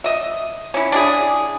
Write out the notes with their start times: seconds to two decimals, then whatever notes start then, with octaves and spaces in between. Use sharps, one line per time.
0.04 D#5 E5
0.74 C#4 E4
0.92 D4 E4 G#4